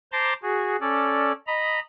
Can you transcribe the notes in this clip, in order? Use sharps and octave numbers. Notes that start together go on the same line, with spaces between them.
C5 A5 A#5 C6 D6
F#4 G#4
C#4 A4 D5
D#5 A#5 B5